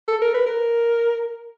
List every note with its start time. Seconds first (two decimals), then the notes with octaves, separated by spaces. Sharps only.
0.08 A4
0.22 A#4
0.34 B4
0.47 A#4